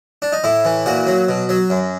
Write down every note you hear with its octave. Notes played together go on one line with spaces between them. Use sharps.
D4
D#4
A2 E4
E3
A#2 F#4
F#3
B2
F#3
F#2